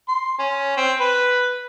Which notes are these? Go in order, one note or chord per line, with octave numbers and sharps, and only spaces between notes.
C6
C#4
C4
B4